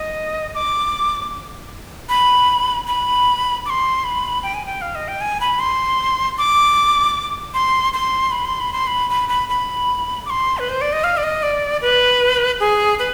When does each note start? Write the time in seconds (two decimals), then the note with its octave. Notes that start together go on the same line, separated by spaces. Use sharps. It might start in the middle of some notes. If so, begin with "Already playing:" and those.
Already playing: D#5
0.55 D6
2.09 B5
2.87 B5
3.66 D6
3.70 C6
4.04 B5
4.43 G5
4.54 G#5
4.66 G5
4.82 F5
4.95 D#5
5.08 G5
5.21 G#5
5.40 B5
5.60 C6
6.38 D6
7.54 C6
7.93 C6
8.31 B5
8.45 C6
8.60 B5
8.73 C6
8.87 B5
9.10 B5
9.29 B5
9.49 B5
10.26 D6
10.30 C6
10.58 B4
10.69 C5
10.81 D5
10.93 D#5
11.04 F5
11.17 D5
11.23 D#5
11.43 D5
11.82 B4
12.60 G#4
12.99 B4